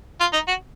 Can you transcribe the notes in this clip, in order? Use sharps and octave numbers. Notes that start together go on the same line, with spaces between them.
F4
D#4
F#4